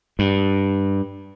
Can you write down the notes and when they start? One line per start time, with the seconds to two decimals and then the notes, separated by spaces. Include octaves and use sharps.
0.19 G2